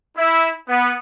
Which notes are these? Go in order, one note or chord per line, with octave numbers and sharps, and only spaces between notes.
E4
B3